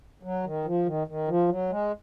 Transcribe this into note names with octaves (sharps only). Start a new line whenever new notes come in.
F#3
D#3
F3
D#3
D#3
F3
F#3
G#3